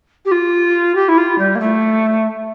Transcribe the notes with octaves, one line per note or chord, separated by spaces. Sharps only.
G4
F4
G4
E4
F4
G3
A#3
A3